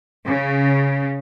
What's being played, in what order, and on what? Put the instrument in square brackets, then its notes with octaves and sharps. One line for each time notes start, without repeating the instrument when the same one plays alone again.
[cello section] C#3